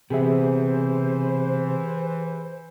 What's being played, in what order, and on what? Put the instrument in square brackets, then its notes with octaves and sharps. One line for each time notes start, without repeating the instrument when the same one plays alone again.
[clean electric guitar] C3 B3 [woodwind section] E3 [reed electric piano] G4 G#4 E5 [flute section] C5